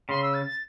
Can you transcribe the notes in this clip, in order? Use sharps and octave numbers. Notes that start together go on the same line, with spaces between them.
C#3 C6
E6
A6
A6